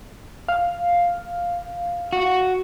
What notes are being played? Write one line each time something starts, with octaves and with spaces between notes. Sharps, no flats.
F5
F#4